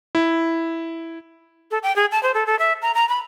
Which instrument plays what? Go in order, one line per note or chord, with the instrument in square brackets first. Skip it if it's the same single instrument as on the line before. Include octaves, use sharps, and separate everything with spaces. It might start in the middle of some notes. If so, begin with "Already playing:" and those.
[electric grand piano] E4
[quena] A4
G5
G#4
A5
C5
A4
A4
E5
A#5
A#5
B5